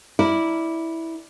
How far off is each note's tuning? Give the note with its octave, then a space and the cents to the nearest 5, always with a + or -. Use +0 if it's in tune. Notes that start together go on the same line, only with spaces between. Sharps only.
E4 -10 A#4 +0 D5 +0